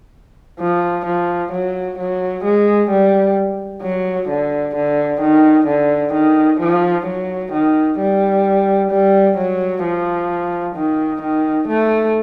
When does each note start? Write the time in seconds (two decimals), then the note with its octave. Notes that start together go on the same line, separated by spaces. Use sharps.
0.60 F3
1.06 F3
1.52 F#3
1.99 F#3
2.44 G#3
2.90 G3
3.83 F#3
4.29 D3
4.75 D3
5.22 D#3
5.67 D3
6.14 D#3
6.60 F3
7.06 F#3
7.53 D#3
7.99 G3
8.91 G3
9.37 F#3
9.83 F3
10.75 D#3
11.22 D#3
11.68 A3